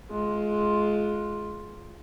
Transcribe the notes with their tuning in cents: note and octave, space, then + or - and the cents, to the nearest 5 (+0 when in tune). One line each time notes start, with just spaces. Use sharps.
G#3 +20 F4 +0